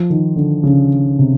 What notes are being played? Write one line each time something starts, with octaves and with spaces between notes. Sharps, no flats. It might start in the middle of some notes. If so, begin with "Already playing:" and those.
Already playing: F3
D#3
D3
C#3
C3